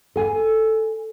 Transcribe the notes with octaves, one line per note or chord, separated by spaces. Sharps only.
A4 G#5